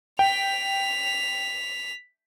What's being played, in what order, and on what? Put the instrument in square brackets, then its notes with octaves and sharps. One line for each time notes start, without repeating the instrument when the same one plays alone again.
[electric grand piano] G5 [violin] B6 F7